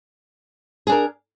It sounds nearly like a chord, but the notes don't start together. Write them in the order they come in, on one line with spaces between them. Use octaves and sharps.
G#4 D4 A#4